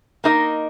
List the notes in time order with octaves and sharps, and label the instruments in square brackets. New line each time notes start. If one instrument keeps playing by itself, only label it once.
[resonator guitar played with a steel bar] A#3 D#4 A#4 D#5